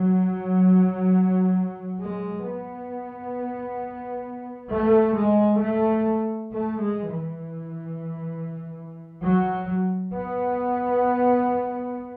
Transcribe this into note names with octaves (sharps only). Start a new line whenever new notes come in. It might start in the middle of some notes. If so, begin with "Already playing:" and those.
Already playing: F#3
G#3
B3
A3
G#3
A3
A3
G#3
E3
F#3
B3